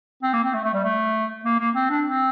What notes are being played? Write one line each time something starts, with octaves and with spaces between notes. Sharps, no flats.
C4
A#3
C4
A3
A3
G3
A3
A#3
A#3
C4
D4
C4